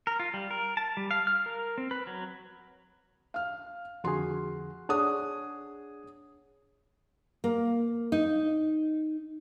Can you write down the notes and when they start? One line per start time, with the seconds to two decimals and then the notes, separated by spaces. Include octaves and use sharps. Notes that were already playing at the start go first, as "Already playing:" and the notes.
0.07 A#4
0.20 F4
0.34 G3
0.51 A#4
0.77 A5
0.97 G3
1.11 F5
1.27 F6
1.46 A#4
1.78 C4
1.91 B4
2.07 F#3
3.34 F5 F6
4.04 F2 D3 F#4 G#4 C6
4.89 D4 G#4 C#5 F#5 D#6
7.44 A#3
8.12 D#4